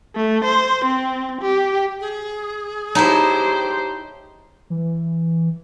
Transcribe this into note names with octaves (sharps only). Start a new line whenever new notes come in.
A3
C5
C4
G4
G#4
D#4 E4 G4 C5 C#5 A5 A#5
E3